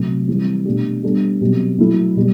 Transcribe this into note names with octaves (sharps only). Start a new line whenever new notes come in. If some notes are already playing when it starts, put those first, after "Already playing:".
Already playing: C3 F#3 A3
E3 G3 C4
B2 A3 D4 G4
G3 B3 D4 A4
B2 F#3 C4 G4
F#3 A3 E4 A4
B2 G3